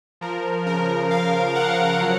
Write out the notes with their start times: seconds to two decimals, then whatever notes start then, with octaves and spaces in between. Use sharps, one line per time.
0.21 F3 A#4
0.66 C#3 A#4
1.11 C#3 F5
1.56 F3 F#5
2.01 F#3